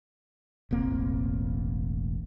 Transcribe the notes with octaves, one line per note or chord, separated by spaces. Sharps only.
E1 A1 A#3 C4